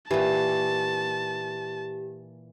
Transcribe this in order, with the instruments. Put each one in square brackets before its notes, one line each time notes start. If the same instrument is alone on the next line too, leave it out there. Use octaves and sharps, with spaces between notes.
[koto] A#2 E3 [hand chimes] G4 [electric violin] A5